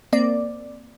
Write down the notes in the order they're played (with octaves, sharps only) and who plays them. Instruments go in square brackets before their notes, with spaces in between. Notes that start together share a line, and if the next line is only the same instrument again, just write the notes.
[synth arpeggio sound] A#3 C4 D5